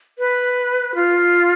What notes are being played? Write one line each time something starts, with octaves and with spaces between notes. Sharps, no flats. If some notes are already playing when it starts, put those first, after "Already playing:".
B4
F4